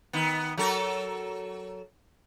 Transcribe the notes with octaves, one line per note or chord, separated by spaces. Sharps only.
D#3 B3
F#3 A4 A#4